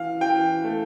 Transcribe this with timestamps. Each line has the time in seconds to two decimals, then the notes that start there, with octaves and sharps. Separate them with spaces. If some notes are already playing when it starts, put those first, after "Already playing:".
Already playing: E3 F5
0.21 E3 G5
0.64 A3